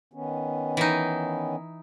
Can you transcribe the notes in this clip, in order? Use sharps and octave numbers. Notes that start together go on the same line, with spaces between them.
D#3 B3 C#4
E3 D#4